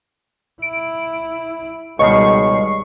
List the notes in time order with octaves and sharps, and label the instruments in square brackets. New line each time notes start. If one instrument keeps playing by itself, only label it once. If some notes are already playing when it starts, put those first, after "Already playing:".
[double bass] E4 [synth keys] D7
[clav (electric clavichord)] C#2 B2 D#3 [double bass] G3 G#3 [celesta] D#5 [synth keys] C#6 C7